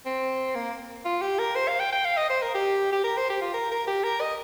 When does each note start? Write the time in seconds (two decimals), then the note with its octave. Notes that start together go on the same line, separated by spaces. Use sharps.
0.06 C4
0.55 A#3
1.05 F4
1.21 G4
1.39 A#4
1.55 C5
1.68 F5
1.79 G5
1.92 G5
2.05 F5
2.17 D#5
2.30 C5
2.42 A#4
2.55 G4
2.92 G4
3.04 A#4
3.17 C5
3.29 G4
3.41 F4
3.54 A#4
3.71 A#4
3.87 G4
4.03 A#4
4.20 D#5